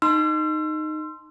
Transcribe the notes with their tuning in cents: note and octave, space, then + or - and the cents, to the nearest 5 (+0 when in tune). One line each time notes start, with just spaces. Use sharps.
D#4 -10 C6 +0 E6 +40